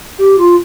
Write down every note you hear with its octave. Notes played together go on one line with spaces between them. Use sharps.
G4
F4